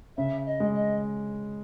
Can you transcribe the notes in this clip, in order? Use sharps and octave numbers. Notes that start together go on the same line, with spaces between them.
C#3 E5
D#5
G#3
D#5